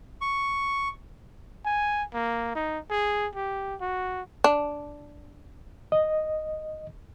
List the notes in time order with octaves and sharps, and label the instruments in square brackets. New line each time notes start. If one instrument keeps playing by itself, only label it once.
[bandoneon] C#6
[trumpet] G#5
A#3
D#4
G#4
G4
F#4
[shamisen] D4
[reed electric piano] D#5